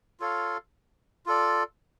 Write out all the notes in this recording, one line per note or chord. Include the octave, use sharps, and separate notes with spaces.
F4 A4 C#5 F5
F4 A4 D5